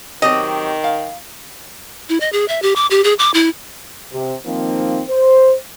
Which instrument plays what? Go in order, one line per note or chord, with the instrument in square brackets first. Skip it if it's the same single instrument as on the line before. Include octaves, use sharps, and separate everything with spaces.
[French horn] D#3 [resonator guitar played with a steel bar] F#3 C4 G4 [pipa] D#5
[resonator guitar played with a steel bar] F5
[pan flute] E4
D#5
G#4
E5
G4
D6
G4
G#4
D6
E4
[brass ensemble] C3
D#3 F3 A#3 C4 D#4
C5